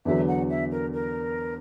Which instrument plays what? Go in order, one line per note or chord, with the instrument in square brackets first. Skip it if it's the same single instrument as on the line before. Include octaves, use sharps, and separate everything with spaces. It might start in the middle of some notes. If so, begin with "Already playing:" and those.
[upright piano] E2 D3 F#3 [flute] E5
[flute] F#5
E5
A#4
A#4